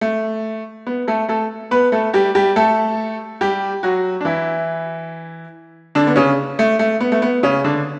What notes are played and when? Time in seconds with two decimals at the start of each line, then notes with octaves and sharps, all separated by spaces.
0.01 A3
0.87 B3
1.08 A3 A4
1.29 A3 A4
1.71 B3 B4
1.92 A3 A4
2.14 G3 G4
2.35 G3 G4
2.56 A3 A4
3.41 G3 G4
3.83 F#3 F#4
4.21 D4
4.25 E3 E4
5.95 D3 D4
6.07 B3
6.16 C#3 C#4
6.59 A3
6.79 A3
7.00 B3
7.12 A3
7.22 B3
7.43 C#3 C#4
7.64 D3 D4